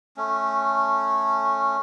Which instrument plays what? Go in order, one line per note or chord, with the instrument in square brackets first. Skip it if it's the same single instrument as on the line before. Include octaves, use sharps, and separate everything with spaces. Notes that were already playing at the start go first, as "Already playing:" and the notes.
[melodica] A3 C#4